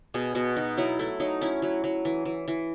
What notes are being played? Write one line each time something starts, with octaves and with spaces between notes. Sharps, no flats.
B2 G#4
B2 F#4
D#4 F#4
F#3 E4
A3 E4
F#3 D#4
C#4 E4
F#3
F#3
E3
E3
E3